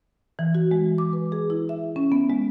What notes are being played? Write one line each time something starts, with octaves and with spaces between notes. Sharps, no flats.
E3
F#4
G#3
D6
B4
G#4
E4
E5
C#4
B3
G#3